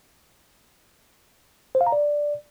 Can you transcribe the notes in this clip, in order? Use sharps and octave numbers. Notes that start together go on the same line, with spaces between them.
C5
F5
A#5
D5